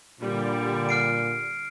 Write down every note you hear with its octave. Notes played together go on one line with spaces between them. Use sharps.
A#2 D3 G3
F6 C7 D7